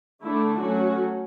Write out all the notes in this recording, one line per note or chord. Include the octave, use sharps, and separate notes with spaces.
D3 A3 D4 E4
F#3 A3 C#4 F#4